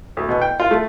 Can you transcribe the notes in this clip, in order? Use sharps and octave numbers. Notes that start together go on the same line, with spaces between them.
D2
B2
G5
F4
A3